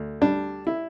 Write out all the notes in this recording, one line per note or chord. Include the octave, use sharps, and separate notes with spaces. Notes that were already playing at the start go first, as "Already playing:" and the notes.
Already playing: D2
G3 D4
E4